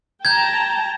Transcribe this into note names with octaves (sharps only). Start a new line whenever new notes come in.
G5 A5 A#5 G6 G#6